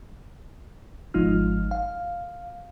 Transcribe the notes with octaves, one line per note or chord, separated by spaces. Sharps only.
G#1 F3 G#3 D#4 F4 F6
F5